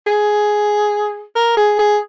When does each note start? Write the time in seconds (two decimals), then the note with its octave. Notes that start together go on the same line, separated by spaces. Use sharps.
0.07 G#4
1.36 A#4
1.57 G#4
1.79 G#4